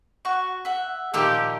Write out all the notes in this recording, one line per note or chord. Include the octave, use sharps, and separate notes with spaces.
F#4 C#6
E5 F#5
A#2 D#3 F3 G4 E6